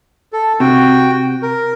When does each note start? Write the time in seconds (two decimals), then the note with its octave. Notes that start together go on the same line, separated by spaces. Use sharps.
0.33 A4
0.60 C3 F#4 G5
1.42 A#4